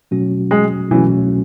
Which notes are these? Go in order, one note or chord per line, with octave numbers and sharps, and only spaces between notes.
B2 F#3 A3 C#4 F#4
G#3
B2 E3 F#3 A3 C#4 F#4